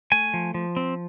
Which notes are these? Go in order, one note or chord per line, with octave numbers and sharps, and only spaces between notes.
A3 G#5
F3
F3
C4